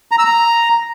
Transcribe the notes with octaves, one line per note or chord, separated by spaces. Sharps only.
A#5
E6
A#5